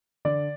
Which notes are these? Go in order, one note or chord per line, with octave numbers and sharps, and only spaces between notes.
D3 D5